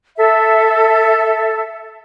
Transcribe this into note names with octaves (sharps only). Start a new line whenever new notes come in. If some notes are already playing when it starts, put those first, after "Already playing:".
A4 E5